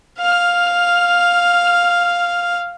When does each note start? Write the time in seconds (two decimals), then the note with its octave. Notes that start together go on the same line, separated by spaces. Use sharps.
0.18 F5 F6